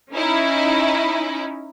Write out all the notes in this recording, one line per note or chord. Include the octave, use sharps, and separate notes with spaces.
C#4 D#4 E4